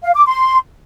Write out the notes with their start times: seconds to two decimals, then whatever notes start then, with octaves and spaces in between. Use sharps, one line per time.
0.03 F5
0.15 D6
0.26 C6